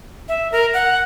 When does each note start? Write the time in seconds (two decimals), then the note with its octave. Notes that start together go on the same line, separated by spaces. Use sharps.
0.29 E5
0.52 A#4
0.74 F#5